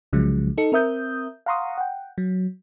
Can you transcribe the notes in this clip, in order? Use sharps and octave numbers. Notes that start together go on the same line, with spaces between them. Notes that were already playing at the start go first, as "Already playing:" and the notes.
C2 C#3 F3 F#3 G#3
D#4 A4 C#7
C4 A#4 E5 D#6 G6
F5 F#5 A#5 C6 C#6 D#6
F#5 G5
F#3